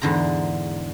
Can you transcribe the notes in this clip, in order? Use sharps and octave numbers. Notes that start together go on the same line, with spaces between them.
E2 G#2 D3 C5 A#5